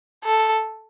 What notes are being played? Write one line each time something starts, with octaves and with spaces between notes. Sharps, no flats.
A4